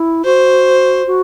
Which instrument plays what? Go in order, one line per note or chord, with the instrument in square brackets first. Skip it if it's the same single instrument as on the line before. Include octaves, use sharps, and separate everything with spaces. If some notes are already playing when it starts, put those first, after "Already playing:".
Already playing: [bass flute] E4
[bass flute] F#4 [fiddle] C5
[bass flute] F#4